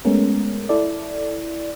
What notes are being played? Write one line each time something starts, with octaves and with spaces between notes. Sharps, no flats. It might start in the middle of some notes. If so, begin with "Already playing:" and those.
G#3 A3 B3 C#4 A#4
E4 A4 D5